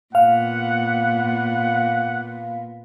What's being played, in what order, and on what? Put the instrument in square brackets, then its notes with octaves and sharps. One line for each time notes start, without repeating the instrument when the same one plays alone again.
[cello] A#2 B3 [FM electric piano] F5 [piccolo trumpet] F#5